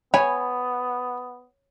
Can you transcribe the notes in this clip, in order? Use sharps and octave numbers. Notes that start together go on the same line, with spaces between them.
B3 C#5 G#5 B5